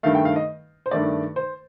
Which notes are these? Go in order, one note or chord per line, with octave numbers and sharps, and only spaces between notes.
G2 D#3 A3 F5
G5
F5
D#5
C5
G2 D#3 A3 D5
C5